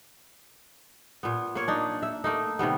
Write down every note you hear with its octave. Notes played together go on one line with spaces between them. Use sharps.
A#2 B3
A#3 C#5
D4 D#4
E5
A3 A#3 D#4
C3 D#3 G3 B3